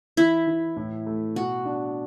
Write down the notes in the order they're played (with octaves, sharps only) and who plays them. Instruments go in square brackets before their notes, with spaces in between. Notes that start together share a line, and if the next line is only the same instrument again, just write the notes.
[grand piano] E3 [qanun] E4
[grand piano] E3
A2
A3
[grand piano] B2 [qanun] F#4
[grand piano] D4